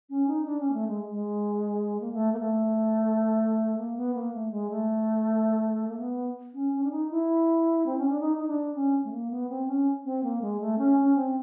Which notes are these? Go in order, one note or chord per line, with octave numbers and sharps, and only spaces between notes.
C#4
D#4
D4
C#4
A#3
A3
G#3
G#3
A#3
A3
A#3
A3
A#3
B3
A#3
A3
G#3
A3
A#3
B3
C#4
C#4
D4
D#4
E4
C4
C#4
D4
D#4
D#4
D4
C#4
A3
A#3
B3
C4
C#4
C4
A#3
G#3
A3
C#4
C#4
C4